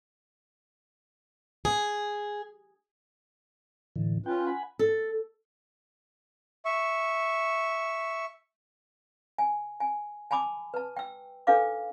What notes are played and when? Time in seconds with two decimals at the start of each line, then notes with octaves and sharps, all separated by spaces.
1.65 G#4
3.96 A2 D3 E3
4.26 C#4 F4 B4 G5
4.47 F#5 G#5 B5
4.79 A4
6.65 E5 C#6
9.38 G#5
9.80 G#5
10.31 G#5 A5 B5 D6 D#6
10.74 B4 A5
10.97 G5 E6
11.47 D4 D#4 A4 B4 F5 D6